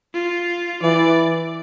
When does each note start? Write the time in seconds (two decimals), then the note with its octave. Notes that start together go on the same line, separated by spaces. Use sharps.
0.14 F4
0.82 E3 D5